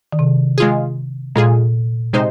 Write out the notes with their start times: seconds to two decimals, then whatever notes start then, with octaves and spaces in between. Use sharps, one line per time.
0.12 D#3
0.19 C3
0.58 G#3 F4 G#4
1.36 A#2 G#3 F4 G#4
2.13 C3 G#3 D#4 C5